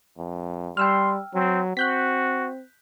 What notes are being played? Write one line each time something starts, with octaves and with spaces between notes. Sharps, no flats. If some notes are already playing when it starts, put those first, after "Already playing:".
F2
G3 G5 C6 E6 F6
F#3 C4
C4 F#4 F#6 G6 B6